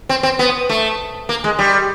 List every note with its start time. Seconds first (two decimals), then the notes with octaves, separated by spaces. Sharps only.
0.09 C4
0.23 C4
0.39 B3
0.69 A3
1.29 A#3
1.44 G#3
1.59 G3